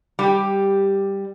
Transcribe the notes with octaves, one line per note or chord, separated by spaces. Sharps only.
G3 G4